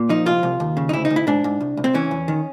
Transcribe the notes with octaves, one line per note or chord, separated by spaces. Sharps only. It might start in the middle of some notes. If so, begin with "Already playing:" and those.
Already playing: A#2
F3 D#4
C2 F4
C2
D#2
C#3
D#4
D2 E4
D#4
D2
E4
G#2 D4
G#2
C2
C2
C4
E3 C#4
E2
D#3